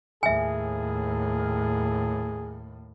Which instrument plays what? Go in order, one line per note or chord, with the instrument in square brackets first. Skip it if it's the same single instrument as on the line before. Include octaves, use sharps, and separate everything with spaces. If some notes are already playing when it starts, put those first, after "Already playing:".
[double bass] D#2 A2 [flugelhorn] G#4 [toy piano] E5 G#5